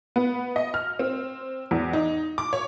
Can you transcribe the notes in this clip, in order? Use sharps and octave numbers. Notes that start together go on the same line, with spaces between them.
B3
D#5
F6
C4
E2
D#4
D6
C#5